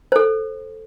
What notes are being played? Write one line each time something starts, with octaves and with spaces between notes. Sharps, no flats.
A4 C5